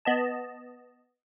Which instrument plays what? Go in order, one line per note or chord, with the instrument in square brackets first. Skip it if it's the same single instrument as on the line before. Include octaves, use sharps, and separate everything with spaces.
[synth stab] B3 D#5 A5